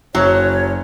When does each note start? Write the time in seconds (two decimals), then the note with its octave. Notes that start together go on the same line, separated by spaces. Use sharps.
0.15 F#1 F#3 C#5